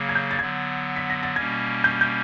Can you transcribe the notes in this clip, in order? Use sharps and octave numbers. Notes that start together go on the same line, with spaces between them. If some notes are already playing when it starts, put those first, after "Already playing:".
Already playing: C#3 F#3 A#3
G#6
G6
A6
D3 F#3 B3 G#6
B6
A#6
A6
B2 G3 A#3 C#4 G#6
G6
G6